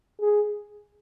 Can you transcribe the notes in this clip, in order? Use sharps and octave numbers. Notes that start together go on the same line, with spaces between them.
G#4